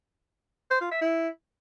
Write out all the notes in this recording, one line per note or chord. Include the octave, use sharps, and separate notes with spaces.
C5
F4
E5
E4